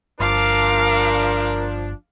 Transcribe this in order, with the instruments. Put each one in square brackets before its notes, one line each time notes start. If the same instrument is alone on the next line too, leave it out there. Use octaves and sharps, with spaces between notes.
[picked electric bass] G1 [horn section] F3 D4 [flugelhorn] A#4 [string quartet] F5 D6